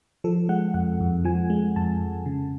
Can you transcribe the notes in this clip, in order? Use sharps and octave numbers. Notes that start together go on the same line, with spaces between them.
F3 A4
G#3 F#5
F2 F#5
F2
F3 G#5
G#3
F2 A5
F2
C#3